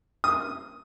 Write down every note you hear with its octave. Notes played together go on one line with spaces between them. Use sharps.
D#6